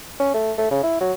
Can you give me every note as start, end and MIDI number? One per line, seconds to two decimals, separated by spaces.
0.19 0.29 61
0.34 0.52 57
0.58 0.68 57
0.71 0.82 49
0.83 0.96 64
1.01 1.13 54